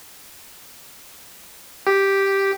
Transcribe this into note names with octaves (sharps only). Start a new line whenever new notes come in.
G4